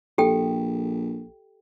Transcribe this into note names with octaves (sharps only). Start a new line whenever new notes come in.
A#1 G4 A4 G5